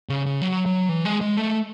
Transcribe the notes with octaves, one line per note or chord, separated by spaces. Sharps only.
C#3
C#3
F#3
F#3
E3
G#3
G#3
A3